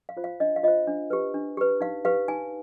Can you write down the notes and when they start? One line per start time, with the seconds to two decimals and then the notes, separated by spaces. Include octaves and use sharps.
0.09 F5
0.17 F4 C5
0.24 F5
0.40 D4 D#5
0.56 F5
0.63 F4 C5 D#5
0.87 D4
1.10 G4 B4
1.34 D4
1.57 G4 B4
1.81 D#4 F5
2.05 G4 B4 F5
2.28 D#4 G#5